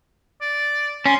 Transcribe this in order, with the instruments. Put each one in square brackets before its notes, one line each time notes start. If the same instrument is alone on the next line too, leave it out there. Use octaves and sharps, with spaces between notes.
[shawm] D5
[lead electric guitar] C#4 [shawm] C6